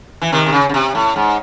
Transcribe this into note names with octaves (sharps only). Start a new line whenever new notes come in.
E3
C3 D#3
C3
C#3
C#3
C3
A2
G#2